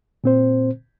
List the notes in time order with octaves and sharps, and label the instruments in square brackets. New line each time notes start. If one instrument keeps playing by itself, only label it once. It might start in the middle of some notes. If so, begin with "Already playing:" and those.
[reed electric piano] A#2 C4 C5